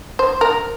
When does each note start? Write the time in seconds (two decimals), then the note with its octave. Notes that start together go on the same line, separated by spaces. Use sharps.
0.19 C5
0.41 A#4